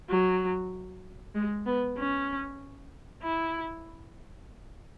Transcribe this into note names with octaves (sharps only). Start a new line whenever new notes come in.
F#3
G#3
B3
C#4
E4